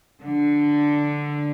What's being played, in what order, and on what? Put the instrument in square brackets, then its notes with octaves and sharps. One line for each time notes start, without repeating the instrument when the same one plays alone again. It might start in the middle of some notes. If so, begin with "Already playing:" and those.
[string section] D3